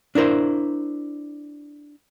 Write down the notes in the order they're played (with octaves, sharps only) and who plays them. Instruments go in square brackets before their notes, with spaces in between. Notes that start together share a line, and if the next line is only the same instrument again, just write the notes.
[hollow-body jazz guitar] D4 E4 A#4 C5